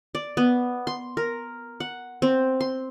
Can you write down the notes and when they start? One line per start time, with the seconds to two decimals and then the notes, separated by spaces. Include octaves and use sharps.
0.15 D5
0.37 B3
0.87 C6
1.17 A#4
1.80 F#5
2.22 C4
2.61 C6